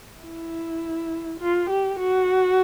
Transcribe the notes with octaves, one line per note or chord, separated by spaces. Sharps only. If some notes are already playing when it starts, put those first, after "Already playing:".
E4
F4
G4
F#4